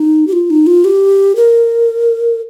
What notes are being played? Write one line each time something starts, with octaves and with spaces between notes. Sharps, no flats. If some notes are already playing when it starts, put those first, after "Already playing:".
Already playing: D#4
G4
F4
D#4
F4
G4
A#4